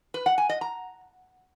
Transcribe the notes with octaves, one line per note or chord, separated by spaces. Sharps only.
B4
F#5
G#5
D#5
A#5